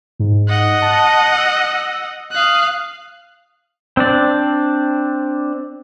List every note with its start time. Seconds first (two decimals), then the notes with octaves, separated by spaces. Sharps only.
0.19 G#2
0.49 D#5 F#5
0.82 A5
1.37 E6
2.31 F5 D#6 F#6
3.97 C4 D4 D5